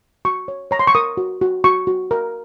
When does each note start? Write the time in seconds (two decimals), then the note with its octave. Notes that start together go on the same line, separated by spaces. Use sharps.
0.25 F#4 C#6
0.48 C#5
0.71 C#5 A#5
0.79 C6
0.87 C#6
0.95 A#4 D#6
1.17 F#4
1.41 F#4
1.64 F#4 C#6
1.87 F#4
2.11 A#4